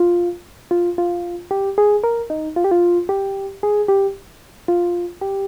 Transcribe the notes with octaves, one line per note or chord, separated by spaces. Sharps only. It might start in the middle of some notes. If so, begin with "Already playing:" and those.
Already playing: F4
F4
F4
G4
G#4
A#4
D#4
F4
G4
F4
G4
G#4
G4
F4
G4